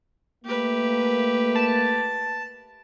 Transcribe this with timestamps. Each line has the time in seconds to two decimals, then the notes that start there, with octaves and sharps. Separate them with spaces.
0.45 A3 A#3 G4 B4
1.55 A5